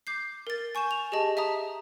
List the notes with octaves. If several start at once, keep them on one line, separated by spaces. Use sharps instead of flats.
D6 G6 C7
A#4 A6
G#5 C#6 G6 E7
F7
G4 G#4 D#5 A5
E5 A5 A#5 D#6